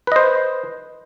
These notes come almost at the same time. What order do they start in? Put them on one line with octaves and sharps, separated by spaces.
B4 D#5 C5